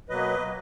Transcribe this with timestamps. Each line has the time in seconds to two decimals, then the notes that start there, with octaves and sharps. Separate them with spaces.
0.09 B2 F#3 A#3 B4 D#5